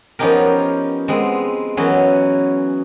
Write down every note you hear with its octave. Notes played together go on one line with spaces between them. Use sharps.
F3 B3 C#4 D#4 G4 A#4
G#3 B3 C4
E3 F#3 B3 C#4